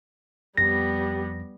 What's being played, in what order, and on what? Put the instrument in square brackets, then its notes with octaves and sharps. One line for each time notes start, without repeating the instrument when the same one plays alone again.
[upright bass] F2 [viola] G3 B3 [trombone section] G4 [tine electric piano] A#6